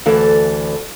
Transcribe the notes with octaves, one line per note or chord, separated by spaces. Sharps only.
D2 E3 A4 D5